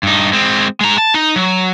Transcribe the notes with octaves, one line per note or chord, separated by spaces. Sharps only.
G2 D#4
G#3 C4
G#3 A#5
A5
D#4
F#3